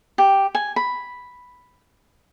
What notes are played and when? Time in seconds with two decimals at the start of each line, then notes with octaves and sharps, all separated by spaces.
0.18 G4
0.55 G#5
0.76 B5